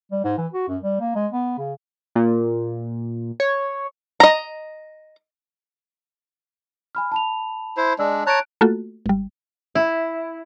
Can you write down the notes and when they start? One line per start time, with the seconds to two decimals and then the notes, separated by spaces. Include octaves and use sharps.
0.12 G3
0.24 G#2
0.38 E3
0.53 F#4
0.69 F#2
0.83 G3
1.01 A#3
1.15 G#3
1.32 B3
1.58 C#3
2.16 A#2
3.40 C#5
4.20 D#5 A#5
6.95 G#5 B5 F6
7.12 A5 B5 F7
7.77 E4 C5
7.99 G#3 D4 D5 E6
8.27 C#5 A5 A#5 F#6 D7
8.61 A3 A#3 F4 F#4 A4
9.06 G#1 G3
9.75 E4